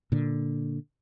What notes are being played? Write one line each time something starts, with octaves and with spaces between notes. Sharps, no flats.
A#2 D3